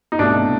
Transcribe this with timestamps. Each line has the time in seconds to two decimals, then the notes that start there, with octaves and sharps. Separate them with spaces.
0.12 D#4
0.19 C2 B2 F#3 A3 D4